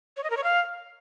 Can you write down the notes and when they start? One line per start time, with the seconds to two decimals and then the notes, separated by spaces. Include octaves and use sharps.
0.17 C#5
0.24 D#5
0.30 A#4
0.37 C#5
0.44 F5